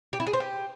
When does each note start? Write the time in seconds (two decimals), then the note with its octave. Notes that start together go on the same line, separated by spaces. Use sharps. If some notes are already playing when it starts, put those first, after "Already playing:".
0.13 G4
0.20 E4
0.27 G#4
0.33 C5
0.40 G4